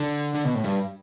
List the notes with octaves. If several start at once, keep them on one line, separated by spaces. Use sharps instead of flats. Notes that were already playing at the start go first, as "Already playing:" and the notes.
Already playing: D3
D3
B2
A2
G2